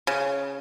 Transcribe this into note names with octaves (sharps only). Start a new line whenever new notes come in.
C#3